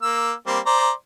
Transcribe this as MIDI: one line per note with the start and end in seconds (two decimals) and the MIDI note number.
0.02 0.32 58
0.02 0.32 88
0.47 0.59 55
0.47 0.59 58
0.47 0.59 60
0.66 0.91 72
0.66 0.91 74
0.66 0.91 82